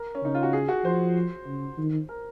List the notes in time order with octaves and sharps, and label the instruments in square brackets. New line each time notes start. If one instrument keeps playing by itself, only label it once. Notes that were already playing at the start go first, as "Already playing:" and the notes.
Already playing: [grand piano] A#4
C#4
[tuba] C#3 [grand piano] D#4
[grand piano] F4
F#4
G#4
F#4
[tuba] F3 [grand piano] C5
[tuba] C#3
D#3
[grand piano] A#4